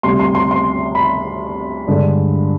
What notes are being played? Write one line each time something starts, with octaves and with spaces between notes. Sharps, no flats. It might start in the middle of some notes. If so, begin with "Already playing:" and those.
D2 C3 G3 C6
C6
C6
C6
B5
G2 D3 G#3 D4